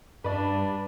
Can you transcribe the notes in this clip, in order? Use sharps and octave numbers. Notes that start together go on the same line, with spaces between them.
G2 D4 B4 D5